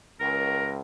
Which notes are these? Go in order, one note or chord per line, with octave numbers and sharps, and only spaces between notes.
C#2 A#4